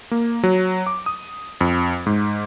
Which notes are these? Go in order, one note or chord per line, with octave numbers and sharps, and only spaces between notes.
A#3
F#3
D6
D#6
F2
G#2